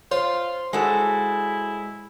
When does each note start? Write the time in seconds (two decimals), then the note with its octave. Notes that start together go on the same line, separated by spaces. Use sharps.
0.12 F4 C5 C#5
0.73 G#3 E4 F#4 A4